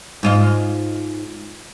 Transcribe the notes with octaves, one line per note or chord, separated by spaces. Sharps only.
G#2 F4 D#5